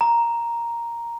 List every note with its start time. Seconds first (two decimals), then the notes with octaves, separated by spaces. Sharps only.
0.01 A#5